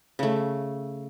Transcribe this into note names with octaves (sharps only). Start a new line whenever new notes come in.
C#3 A3